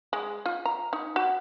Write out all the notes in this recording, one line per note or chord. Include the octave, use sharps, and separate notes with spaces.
G#3
F4
A#5
D#4
F#4